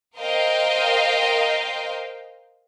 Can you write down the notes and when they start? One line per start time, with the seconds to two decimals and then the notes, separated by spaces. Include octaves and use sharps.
0.17 A#4 C5 D#5 F5 G5